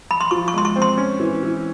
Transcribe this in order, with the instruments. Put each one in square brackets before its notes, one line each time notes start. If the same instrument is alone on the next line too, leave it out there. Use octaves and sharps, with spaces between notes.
[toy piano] B5
C6
[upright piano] F3 [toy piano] C#6
[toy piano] C#6
[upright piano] G#3 [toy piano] C6
[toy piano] C#6
[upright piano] C4
[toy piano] C6
[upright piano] C#4
E3
E3